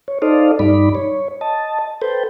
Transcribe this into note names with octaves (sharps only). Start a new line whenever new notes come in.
C#5
D#4 A4 C5 D5 D#5 F5
G2 G3 D#4 D5 B5
C#5
D#5 A5
A4 B4 C5 G5